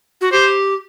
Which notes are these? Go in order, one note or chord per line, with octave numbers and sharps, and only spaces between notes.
F#4
G4 C5